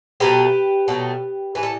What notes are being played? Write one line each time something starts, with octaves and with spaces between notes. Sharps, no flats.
B2 F#3 A3 G4 B4
B2 F#3 A3
A2 E3 G3 B4
A4